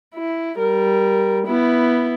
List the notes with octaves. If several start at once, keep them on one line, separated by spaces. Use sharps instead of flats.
E4
G3 A#4
B3 E4